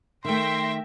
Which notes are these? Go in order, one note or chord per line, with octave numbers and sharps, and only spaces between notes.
D#3 A3 E5 G5 C6 A#6